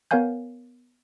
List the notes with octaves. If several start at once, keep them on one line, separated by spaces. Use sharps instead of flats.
B3 A#4 C#5 F5 G#5 G6